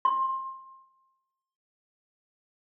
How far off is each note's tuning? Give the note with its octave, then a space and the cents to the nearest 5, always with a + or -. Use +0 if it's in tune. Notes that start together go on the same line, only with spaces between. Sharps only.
C6 +25